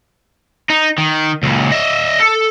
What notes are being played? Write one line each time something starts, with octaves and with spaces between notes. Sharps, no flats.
D#4
D#3
C#2 A#2
D#5 E5
A4